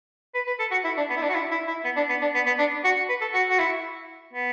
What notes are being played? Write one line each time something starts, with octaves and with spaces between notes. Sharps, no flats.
B4
B4
A4
F#4
E4
D4
B3
E4
D4
F#4
E4
E4
E4
B3
D4
B3
D4
B3
B3
D4
F#4
B4
A4
F#4
F#4
E4
B3